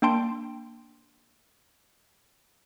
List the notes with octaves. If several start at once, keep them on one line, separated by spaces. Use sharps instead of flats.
A#3 D4 G5 A5 C6 D7